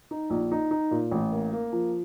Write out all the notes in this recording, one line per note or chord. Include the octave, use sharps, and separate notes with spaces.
D#4
A#1
D#4
D#4
A#2
A1
A#3
A#3
F3